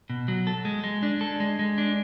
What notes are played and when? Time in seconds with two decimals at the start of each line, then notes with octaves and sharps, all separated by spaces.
0.10 B2
0.28 F#3
0.47 A4
0.65 G#3
0.84 G#3
1.03 D4
1.21 A4
1.40 G#3
1.59 G#3
1.78 D4